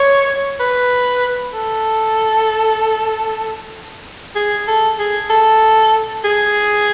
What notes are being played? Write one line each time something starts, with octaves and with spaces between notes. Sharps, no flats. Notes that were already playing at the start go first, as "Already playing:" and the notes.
Already playing: C#5
B4
A4
G#4
A4
G#4
A4
G#4